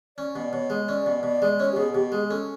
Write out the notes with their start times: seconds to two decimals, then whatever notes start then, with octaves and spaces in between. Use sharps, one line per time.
0.17 C#4 D5
0.35 B2
0.53 B2 C#5
0.70 G#3
0.89 C#4 D5
1.06 B2
1.23 B2 D5
1.42 G#3
1.60 C#4 C#5
1.72 G4
1.76 B2 G#4
1.94 B2 G4
2.12 G#3 G#4
2.30 C#4 A4